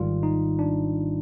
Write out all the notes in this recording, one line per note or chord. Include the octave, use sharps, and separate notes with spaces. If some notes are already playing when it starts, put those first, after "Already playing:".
Already playing: G#1 G#2 D#3 G3 F4
D#4
D4